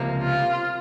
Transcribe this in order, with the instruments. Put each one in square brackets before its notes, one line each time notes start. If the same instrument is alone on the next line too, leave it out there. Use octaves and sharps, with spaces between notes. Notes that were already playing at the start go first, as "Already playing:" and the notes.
Already playing: [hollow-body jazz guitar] C#2 C3 F3 A#3
[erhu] F4